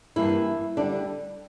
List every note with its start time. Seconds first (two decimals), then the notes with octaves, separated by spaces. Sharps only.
0.16 G2 E3 A#3 E4
0.77 D3 G3 D4